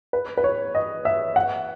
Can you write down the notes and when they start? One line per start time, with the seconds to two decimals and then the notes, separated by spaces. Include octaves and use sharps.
0.13 B4
0.37 B4
0.44 C#5
0.75 D#5
1.05 E5
1.36 F#5